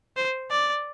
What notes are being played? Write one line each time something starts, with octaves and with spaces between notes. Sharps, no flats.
C5
D5